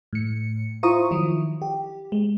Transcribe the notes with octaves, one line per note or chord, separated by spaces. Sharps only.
A2 C#7
E4 F4 C5 A#5 C#6 D#6
D#3 F3 F#3 E4
G4
G#3